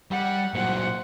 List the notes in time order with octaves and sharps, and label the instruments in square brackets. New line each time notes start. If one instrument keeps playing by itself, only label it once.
[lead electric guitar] G3 [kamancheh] F#5
[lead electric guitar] A#2 F#3 [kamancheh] C5 F#5